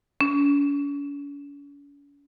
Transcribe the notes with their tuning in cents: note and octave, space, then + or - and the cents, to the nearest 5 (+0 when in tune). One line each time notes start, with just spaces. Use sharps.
C#4 +45